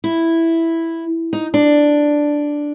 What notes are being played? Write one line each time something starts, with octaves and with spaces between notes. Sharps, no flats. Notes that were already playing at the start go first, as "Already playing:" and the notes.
E4
D#4
D4